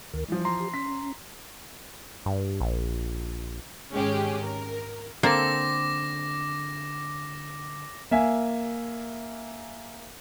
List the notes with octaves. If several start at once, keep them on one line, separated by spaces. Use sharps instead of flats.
D2 D#3 A#4
E3 F3 G3
A#5 C6
G4
C#4 B6
G2
A#1
G#1 G#3 C#4 G4 G#4
A#4
D3 A#3 C4 A4 D6 A#6
A#3 E5 G#5